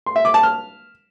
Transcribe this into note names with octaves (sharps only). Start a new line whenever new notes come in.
C6
E5
D6
A5
F6